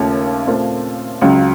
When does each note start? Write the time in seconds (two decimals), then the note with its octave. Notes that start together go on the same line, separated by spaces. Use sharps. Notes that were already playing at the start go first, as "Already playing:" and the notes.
Already playing: D#2 C#3 A3 C#4 F4
0.47 A#2 A3 C4 F4
1.22 C#2 C#3 F#3